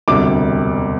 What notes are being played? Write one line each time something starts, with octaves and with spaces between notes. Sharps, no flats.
E1 D2 C3 G3 D6